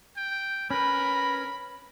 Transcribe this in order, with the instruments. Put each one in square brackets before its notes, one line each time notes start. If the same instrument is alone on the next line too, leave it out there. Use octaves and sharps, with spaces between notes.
[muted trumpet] G5
[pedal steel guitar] C#4 B4 [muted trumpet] A#4 [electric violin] B5